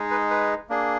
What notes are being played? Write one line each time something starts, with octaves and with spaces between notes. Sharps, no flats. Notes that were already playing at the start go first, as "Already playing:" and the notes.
Already playing: G#3 D#4 G#4
B4
B4
A#3 D4 G#4